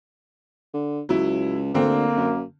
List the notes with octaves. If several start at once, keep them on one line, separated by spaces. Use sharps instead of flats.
D3
C#2 F#3 E4
D2 D3 A#3 C4
F#2